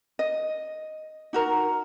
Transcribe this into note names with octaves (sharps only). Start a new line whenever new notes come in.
D#5
D#4 F#4 A#4